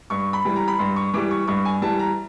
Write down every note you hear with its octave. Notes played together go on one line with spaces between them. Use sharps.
G2 C#6
B5
E3 G3
A#5
B5
G2 C6
C#6
E3 G3 D6
C#6
G2 C#6
G#5
E3 G3 A5
A#5